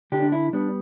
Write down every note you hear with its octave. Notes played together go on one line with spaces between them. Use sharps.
D3 D4 G4
D4
E4
G3 B3 D4